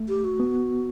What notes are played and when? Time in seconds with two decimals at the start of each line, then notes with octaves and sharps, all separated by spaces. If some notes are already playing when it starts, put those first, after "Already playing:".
Already playing: A3
0.09 G4
0.24 F#4
0.40 B3